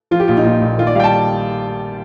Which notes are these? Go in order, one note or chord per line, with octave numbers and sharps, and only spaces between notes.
F3 F4
G4
A#1 F4
D#4
A#2 F4
A#1
D#3 F4
D5
G3 F5 G5
A5